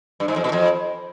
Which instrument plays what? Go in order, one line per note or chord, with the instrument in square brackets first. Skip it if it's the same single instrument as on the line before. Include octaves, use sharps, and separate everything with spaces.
[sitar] G2
G#2
F2
B2
F2